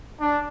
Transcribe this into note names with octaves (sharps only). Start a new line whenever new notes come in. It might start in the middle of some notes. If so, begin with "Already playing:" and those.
D4